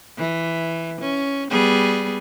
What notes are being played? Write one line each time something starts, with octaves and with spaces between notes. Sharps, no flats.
E3
C#4
G3 B3 G#4